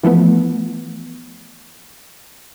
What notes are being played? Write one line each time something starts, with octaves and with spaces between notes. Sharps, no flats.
E3 F3 A3 B3